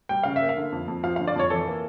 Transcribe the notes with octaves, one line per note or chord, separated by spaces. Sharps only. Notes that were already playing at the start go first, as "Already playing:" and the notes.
G3 G5
C#3 F5
E5
A#3
F5
D3
F2
F2
F3 F5
D3 F5
D5
F2 C#5
E3 A4
A#3